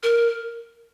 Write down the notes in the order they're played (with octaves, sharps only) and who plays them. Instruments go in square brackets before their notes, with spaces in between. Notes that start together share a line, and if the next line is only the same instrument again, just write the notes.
[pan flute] A#4